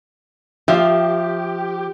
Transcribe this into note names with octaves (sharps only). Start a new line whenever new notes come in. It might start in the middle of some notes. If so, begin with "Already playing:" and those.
F3 G4 E5 F5